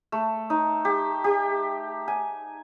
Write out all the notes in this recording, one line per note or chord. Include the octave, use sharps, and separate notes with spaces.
A3
D#4
G4
G4
G#5